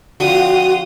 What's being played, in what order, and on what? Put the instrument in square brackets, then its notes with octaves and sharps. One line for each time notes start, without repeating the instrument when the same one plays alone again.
[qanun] D3 F3 C4 [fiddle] F4 D#6 [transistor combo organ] F#4